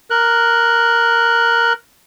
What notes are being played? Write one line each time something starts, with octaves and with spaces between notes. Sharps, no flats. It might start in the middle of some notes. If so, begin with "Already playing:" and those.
A#4 F#6